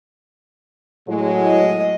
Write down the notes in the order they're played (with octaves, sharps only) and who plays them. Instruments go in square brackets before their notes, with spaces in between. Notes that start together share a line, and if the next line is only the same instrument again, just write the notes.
[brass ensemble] A2 F#3 G#3
[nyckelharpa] D#5